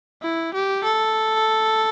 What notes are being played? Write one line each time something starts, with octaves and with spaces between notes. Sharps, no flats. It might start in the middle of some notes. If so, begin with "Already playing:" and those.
E4
G4
A4